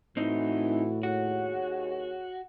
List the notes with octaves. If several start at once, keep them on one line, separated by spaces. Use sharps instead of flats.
A2 E3 C4 D#4 E4 F#4
D#2 F#4 G#4 C#5